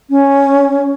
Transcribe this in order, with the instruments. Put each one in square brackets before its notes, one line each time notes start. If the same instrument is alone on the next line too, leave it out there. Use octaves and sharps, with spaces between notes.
[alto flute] C#4